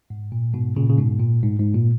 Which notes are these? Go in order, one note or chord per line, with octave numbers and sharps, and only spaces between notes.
G#2
A#2
G#2 B2
A#2 C#3
C#3
G#2 B2
A#2
G#2
G#2
A#2